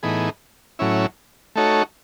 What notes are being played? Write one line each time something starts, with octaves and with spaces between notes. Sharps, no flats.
A2 E3 B3 D#4 G#4
A2 F#3 C#4 E4
A3 D#4 F#4 A4 C#5